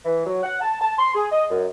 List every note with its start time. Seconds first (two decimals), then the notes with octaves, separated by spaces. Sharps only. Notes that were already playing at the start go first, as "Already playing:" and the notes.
0.05 E3
0.27 F#3
0.43 F#5
0.61 A5
0.81 A5
0.99 C6
1.15 G#4
1.31 D#5
1.51 F#2